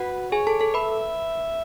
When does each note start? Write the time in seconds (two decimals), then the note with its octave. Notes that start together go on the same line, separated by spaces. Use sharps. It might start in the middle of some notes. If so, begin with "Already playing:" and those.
Already playing: F#4 B4 F#5
0.32 G#4 C#5 G#5
0.47 A4 A5
0.60 A4 A5
0.74 B4 E5 B5